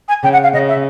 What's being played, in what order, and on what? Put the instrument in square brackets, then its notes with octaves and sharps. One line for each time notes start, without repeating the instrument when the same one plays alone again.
[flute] G#5
[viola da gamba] C#3 [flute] G5
[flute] F#5
F5
[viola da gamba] C#3 [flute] D#5
[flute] E5